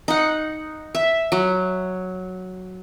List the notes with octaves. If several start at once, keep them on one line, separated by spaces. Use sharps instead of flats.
D#4 F#5
E5
F#3